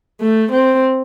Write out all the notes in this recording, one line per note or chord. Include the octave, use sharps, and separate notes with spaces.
A3
C4